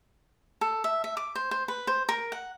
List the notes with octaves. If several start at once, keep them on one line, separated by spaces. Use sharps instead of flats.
A4
E5
E5
D6
C5
C5
B4
C5
A#4
F#5